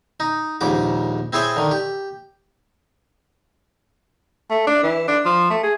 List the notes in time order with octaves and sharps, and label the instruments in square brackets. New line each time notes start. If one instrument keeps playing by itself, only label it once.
[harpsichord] D#4
A#1 D#2 G#2 C#3 D6
C4 E4 G#4 C5 C#5
D3 D#3
G4
[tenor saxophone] A3
D4
E3
D4
F3
A3
G#4